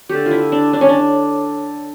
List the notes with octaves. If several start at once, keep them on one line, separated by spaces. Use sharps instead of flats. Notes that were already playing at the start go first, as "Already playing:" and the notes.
D3 A3 G4
F4
E4
D4
D4
C#4
D4